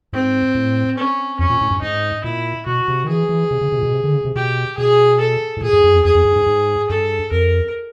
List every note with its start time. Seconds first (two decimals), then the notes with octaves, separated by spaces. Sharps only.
0.13 G#2 C4
0.55 A2
0.98 C#4
1.39 F2 C#4
1.50 A#2
1.61 A2
1.71 G2
1.81 G#2 D#4
2.24 A#2 E4
2.66 B2 F#4
2.88 C3
3.05 D#3
3.09 E3 G#4
3.29 E3
3.51 C3
3.61 C#3
3.72 C3
3.79 A#2
3.83 B2
3.93 C3
4.04 D3
4.14 C#3
4.25 C3
4.36 B2 G4
4.77 B2 G#4
5.20 A4
5.57 A2
5.61 A#2 G#4
5.73 G2
5.84 F#2
5.93 F2
6.05 F2 G#4
6.15 F2
6.25 G2
6.36 G#2
6.46 G#2
6.89 G2 A4
7.31 F2 A#4